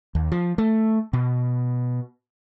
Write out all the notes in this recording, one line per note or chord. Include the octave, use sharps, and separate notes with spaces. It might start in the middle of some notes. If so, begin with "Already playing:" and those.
D#2
F3
A3
B2